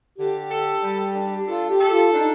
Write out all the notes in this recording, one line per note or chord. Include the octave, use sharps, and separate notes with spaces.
D3 G4
A4
G3
D4
F4 A4
G4
A4
F4
D4 D#4